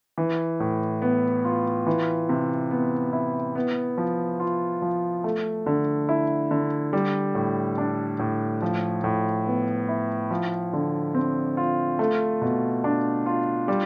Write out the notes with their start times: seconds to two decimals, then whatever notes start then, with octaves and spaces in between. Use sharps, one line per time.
0.18 E3
0.60 A2
1.02 B3
1.45 F4
1.86 E3
2.29 C3
2.71 B3
3.13 E4
3.56 B3
3.98 F3
4.40 F4
4.82 F3
5.24 A3
5.66 D3
6.09 E4
6.51 D3
6.93 G3
7.35 A2
7.78 D4
8.19 A2
8.62 F3
9.04 A2
9.47 B3
9.89 E4
10.31 F3
10.73 D3
11.15 C4
11.57 F4
11.99 A3
12.41 B2
12.84 D4
13.26 F4
13.68 G3